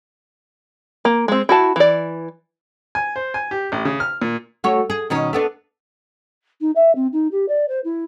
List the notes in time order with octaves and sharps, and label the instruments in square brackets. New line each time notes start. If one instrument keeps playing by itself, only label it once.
[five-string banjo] A#3
G#3 C4
E4 F#4 A5
E3 D5
[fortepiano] G#5
C5
G#5
G4
A1
C#3
F6
A#2
[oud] A3 F#4 C#5
G#4
B2 D#3 C#4
A3 B3 D4
[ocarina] D#4
E5
C4
D#4
G4
D5
C5
E4